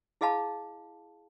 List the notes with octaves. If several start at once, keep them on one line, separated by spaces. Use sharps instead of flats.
E4 G#4 D#5 F5 A5 B5